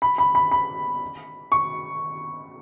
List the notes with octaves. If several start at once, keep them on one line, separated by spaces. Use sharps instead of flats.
B5
B5
B5
B5
C#6